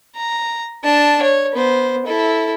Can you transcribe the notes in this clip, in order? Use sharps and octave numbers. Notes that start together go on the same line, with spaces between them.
A#5
D4 A5
C#5
B3 C5
E4 A4